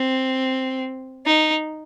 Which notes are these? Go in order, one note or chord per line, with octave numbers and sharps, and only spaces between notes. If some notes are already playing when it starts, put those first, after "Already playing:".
Already playing: C4
D#4